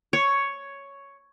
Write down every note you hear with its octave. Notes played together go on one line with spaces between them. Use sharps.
C#5